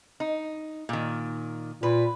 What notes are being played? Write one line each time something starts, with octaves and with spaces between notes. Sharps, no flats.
D#4
A#2 D#3
A#2 B4